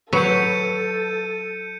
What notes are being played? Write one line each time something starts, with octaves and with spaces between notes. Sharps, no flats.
F#3 A4 B4 G6 C#7 D#7